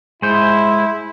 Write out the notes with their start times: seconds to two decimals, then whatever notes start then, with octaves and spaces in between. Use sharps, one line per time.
0.22 G#3 E4 C5